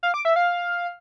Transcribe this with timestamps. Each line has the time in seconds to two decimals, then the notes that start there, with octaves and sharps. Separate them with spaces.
0.03 F5
0.14 D6
0.25 E5
0.36 F5